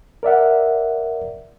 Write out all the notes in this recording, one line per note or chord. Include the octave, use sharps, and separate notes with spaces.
A#4 D5 E5 F#5